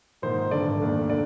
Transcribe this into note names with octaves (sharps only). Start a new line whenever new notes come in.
A#1 G#2 D#3 C5
G#1 G2 D3 D5
F1 D#2 D3
D3 D5